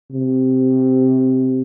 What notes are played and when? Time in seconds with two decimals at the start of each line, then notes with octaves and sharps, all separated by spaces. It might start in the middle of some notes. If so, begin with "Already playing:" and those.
0.12 C3